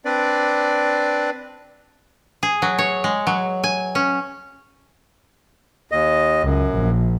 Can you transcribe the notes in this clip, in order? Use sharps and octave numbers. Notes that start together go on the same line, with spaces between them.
C4 D4 B4 D5
G#4
F#3
C#5
G#3
F#3
G#5
C#4
D#2 D#5
C#2 F#2
A#1